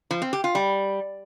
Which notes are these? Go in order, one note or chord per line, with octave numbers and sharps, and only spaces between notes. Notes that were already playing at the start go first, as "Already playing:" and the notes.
F3
C4
G4
F4
G3